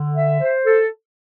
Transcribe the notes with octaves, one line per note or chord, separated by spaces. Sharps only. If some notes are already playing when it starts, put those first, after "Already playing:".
Already playing: D3
E5
C5
A4